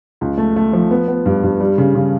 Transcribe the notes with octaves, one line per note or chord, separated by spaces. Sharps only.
C#2
A3
A3
F3
B3
B3
G2
G2
G3
C#3
C#3